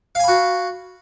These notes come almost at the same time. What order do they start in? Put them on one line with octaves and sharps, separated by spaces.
F5 G#5 B5 F#4